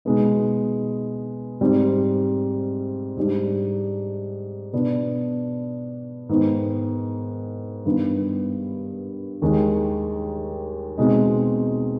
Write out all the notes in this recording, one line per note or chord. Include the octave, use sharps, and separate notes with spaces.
B2 G#3 B3 D#4
G#2 G3 C4
G#2 G3 D4
B2 B3 D4
G#2 D#3 B3 D#4
G2 D#3 B3
D#2 D#3 G#3
B2 G#3 C4 D#4